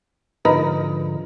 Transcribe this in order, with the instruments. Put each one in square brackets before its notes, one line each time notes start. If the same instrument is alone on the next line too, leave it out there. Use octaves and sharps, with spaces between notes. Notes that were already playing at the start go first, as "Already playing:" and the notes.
[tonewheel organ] G#2 D3 F3 [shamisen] D#4 A#4 B4